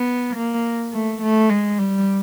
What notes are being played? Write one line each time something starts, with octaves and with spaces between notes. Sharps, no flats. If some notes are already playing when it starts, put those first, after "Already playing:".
Already playing: B3
A#3
A3
A3
G#3
G3